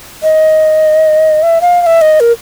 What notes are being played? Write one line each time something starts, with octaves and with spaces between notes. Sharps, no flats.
D#5
E5
F5
F5
E5
D#5
A#4